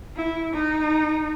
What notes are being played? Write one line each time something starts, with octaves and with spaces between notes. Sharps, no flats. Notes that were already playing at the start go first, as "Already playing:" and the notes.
E4
D#4